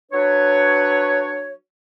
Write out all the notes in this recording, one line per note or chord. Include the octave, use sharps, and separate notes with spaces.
F#3 D4 B4 C#5